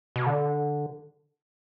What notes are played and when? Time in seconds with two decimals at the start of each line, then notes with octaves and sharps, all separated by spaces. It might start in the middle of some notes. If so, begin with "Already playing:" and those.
0.16 B2
0.26 D3